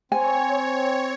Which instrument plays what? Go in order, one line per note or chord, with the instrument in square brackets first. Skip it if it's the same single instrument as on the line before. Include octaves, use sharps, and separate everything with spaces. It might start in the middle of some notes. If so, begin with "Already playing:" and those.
[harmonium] C4 [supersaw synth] C#5 [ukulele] G#5